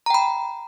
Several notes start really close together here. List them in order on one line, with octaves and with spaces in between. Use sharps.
A#5 G5 B5